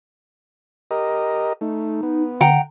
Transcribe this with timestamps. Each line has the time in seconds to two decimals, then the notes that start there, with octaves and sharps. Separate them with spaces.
0.91 G4 A#4 D#5
1.61 A3 D#4
2.03 B3
2.41 D3 F#5 G5 A#5